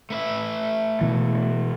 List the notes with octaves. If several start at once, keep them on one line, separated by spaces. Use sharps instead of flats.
A3 B4 E5
B2 E3